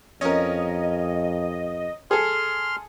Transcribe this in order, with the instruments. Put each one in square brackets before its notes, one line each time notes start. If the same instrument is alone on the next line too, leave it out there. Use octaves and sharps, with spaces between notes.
[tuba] F2 [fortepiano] C#4 A#4 [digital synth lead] D#5
[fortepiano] G#4 A4 [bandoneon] C6 F6